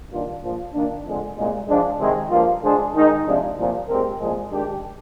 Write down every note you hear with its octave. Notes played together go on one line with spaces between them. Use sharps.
G2 D#3 A#3 D4 F4
A#1 A#2 F3
D#3 A#3 D4
F2 D3 G#3
C2 A#2 G#3
G#2 F3 G#3 D4
C3 D#3 G#3 C4
G2 F3 A#3 F4
D3 G#3 D4 G#4 C5
D#3 G#3 D#4 G#4
C3 F3 G#3 D4
C2 A#2 F3
A#2 G#3 C4 G4 A#4
C2 A#2 F3 G#3
D#3 G#3 D4 G4